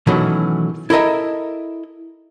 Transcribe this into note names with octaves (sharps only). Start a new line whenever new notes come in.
B2 D#3 E3 F#3 A3 C#4
E4 A4 A#4 D#5 E5